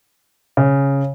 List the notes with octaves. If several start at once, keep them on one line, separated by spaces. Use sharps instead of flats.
C#3